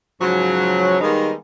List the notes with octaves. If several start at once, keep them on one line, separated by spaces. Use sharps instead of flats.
G#2 C#3 F3 F#3
D#3 G3 G#3 A#3 B3 D#4